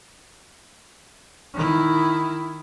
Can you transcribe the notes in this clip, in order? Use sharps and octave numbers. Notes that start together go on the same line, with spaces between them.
D#3 E4